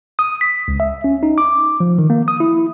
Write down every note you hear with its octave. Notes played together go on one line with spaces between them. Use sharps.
D#6
B6
C#2
E5
C#4
D#4
D6
F3
D#3
A#3
D#6
E4